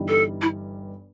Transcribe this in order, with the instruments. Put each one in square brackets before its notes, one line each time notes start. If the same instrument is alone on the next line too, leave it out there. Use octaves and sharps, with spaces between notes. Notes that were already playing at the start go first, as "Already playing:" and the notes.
Already playing: [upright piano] G1 G2 E3 G3 D#4
[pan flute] A4
E4